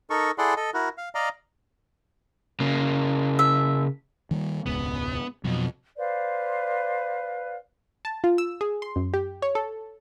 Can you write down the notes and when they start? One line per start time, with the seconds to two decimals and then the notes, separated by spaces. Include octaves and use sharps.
0.10 D#4 A4 A#4 C#6
0.38 E4 G#4 A4 D5 F#5 C6
0.56 A4 D#5
0.74 E4 F#4 A#4
0.98 F5
1.15 D5 D#5 F5 A#5
2.60 C#3 A#3
3.39 E5
4.31 D#3 G3 A#3
4.66 E1 C#2 G#2 B3
5.44 F2 B2 F#3
5.97 B4 C5 D5 F5
8.05 A5
8.24 F4
8.38 E6
8.61 G#4
8.82 C6
8.96 F#2
9.14 G4
9.42 C#5
9.55 A4